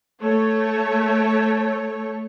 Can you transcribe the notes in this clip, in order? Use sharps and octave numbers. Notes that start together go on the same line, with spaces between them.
A3 C#5